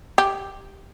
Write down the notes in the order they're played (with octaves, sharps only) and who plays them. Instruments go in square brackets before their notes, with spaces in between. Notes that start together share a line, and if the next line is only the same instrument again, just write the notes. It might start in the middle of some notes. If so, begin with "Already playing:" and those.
[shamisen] G4